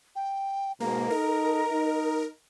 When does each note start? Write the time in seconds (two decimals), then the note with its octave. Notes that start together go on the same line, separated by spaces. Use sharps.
0.16 G5
0.80 G#2 B2 A#3 A#5
1.10 D#4 A4 A#4
1.70 D#4